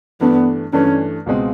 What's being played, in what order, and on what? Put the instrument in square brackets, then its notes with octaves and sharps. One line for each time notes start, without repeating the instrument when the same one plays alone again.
[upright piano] G2 E3 A3 D4 [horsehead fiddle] B3
[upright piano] G2 E3 A3 D4 [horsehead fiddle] C#4
[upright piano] C#2 B2 G#3 C4